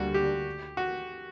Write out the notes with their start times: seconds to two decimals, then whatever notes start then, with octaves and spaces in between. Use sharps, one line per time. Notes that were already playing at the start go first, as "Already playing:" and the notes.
Already playing: D2 D3 G3 A#3 F#4
0.14 G4
0.77 F#4